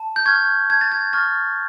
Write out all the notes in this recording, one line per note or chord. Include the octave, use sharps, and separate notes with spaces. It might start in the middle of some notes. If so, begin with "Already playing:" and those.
Already playing: A5
G6
C#6 F6 G#6
A5 G#6
A6
G#6
C#6 F6 A6